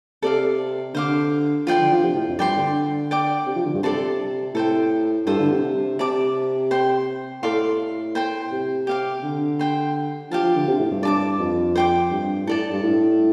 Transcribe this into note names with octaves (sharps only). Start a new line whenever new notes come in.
C3 A4 D5 F5
D3 C5 F5 D6
F3 F4 D5 G5 C6
D3
F3
C3
A2
F2
G2 D5 G5 C6
D3
D5 G5 D6
C3
F3
D3
G2
C3 A4 D5 A5 C6
A2 A4 C5 G5
G2 F4 A4 C5
D3
C3
C3 D5 A5 D6
C5 G5 C6
A2 A4 D5 F5 C6
C5 G5 C6
C3
G4 F5 D6
D3
C5 G5 C6
F3 G4 F5 A5
F3
D3
C3
A2
G2
D5 A5 D6
F2
C5 G5 D6
G2
A2 A4 D5 A5
G2
A2